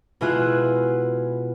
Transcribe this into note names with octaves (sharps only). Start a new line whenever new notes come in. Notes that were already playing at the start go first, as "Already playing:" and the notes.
B2 G#3 E4 F4 G#4 F#6